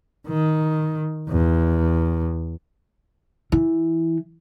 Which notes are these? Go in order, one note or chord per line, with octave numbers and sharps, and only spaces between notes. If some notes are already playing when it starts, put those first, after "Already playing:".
D#3
E2
E3